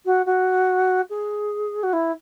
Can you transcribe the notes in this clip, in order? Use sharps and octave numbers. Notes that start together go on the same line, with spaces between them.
F#4
F#4
G#4
F#4
E4